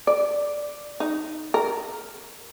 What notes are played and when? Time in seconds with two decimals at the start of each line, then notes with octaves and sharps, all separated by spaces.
0.07 D5
1.00 D#4
1.54 A#4